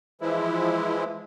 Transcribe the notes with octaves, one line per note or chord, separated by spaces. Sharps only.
E3 F3 G#3 E4